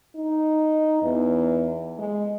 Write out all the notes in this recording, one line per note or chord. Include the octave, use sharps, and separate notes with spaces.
D#4
E2
G#3